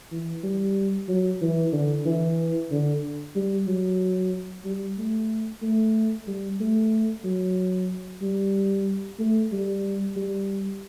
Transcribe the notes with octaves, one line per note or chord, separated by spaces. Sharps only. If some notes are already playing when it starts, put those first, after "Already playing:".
E3
G3
F#3
E3
D3
E3
D3
G3
F#3
G3
A3
A3
G3
A3
F#3
G3
A3
G3
G3